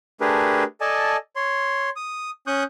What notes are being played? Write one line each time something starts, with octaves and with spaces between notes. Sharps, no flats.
A3 D4 G4 G#4 A#4 B4
A4 D5 D#5 G#5 A5
C#5 C6
D#6
C#4 C#6 D#6 F#6 G6